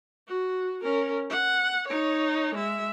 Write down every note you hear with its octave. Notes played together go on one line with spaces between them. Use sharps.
F#4
C#4 A#4
F#5
D#4 C#5
G#3 E5